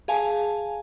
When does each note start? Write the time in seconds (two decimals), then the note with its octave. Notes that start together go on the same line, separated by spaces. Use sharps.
0.08 G#4 F5 G#5 A5